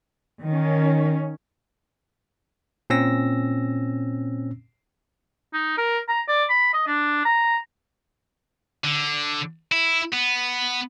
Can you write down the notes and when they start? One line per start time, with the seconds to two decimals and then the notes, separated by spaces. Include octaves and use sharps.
0.46 D#3 C#4
2.90 A#2 C4 C#4 E6 A#6
5.53 D#4
5.77 A#4
6.08 A#5
6.28 D5
6.50 B5
6.73 D#5
6.87 D4
7.25 A#5
8.84 D3
9.72 E4
10.13 B3